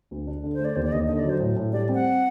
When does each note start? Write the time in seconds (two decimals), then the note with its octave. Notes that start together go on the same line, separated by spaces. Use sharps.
0.11 D2
0.27 D4
0.44 D3
0.54 C5
0.59 A3
0.65 D5
0.76 D#2 C5
0.84 D5
0.92 D#2 D#5
1.08 D3 D#5
1.19 D5
1.24 F#3
1.30 C5
1.40 A2
1.56 A2
1.73 G3 D5
1.89 C4
1.94 F#5